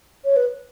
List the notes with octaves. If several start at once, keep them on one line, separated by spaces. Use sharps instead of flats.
C#5
B4